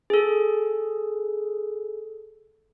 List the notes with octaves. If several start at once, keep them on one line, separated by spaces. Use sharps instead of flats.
G#4 A4